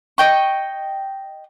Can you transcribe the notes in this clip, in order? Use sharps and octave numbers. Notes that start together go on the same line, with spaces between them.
D#5 G5 C#6